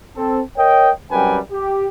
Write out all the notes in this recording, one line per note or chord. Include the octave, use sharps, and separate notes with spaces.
C4 A4
A#4 C#5 D#5 G5
C2 F#2 G3 B4 G5 G#5
G4